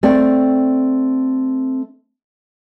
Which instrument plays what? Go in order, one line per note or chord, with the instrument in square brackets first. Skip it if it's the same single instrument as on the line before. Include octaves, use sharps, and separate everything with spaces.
[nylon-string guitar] A3 C4 D5 G5